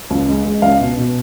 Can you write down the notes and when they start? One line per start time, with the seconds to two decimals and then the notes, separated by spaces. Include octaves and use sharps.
0.10 C#2
0.29 G#3
0.45 G#3
0.62 C#2 F5
0.80 B2
0.97 B2